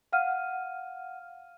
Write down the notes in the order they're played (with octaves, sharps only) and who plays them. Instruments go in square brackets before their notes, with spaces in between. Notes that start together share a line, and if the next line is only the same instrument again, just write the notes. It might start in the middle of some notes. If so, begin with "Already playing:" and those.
[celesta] F5 F#5 F6 D#7